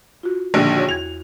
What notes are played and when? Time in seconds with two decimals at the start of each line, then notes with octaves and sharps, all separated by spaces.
0.23 F4 F#4
0.54 A#1 D#2 D3
0.75 F#4 C#5
0.89 E2 G#6 F7